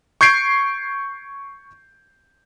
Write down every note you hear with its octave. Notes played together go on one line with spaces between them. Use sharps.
C#6 G6 G#6 C7 D7